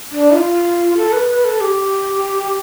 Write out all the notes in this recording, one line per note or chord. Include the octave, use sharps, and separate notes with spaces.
D4
F4
A4
B4
B4
A4
G4